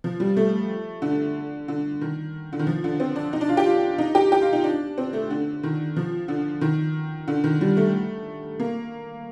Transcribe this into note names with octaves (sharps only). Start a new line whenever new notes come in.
F3
G3
A3
D3
D3
D#3
D3
D#3
F3
D3
C4
D4
D#4
D4
F4
G4
F4
D#4
G4
G4
F4
D#4
D4
C4
A3
D3
D#3
F3
D3
D#3
D3
D#3
G3
A3
A#3